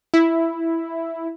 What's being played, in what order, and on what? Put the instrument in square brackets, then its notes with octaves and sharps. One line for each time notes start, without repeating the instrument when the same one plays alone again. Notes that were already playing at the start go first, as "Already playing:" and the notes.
[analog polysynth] E4